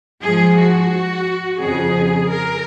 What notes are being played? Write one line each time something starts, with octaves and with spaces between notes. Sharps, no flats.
G#2 F3 G#4
F#4
F2 C#3 F3 G#4
A#4